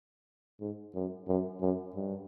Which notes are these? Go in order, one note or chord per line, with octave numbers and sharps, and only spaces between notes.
G#2
F#2
F#2
F#2
G2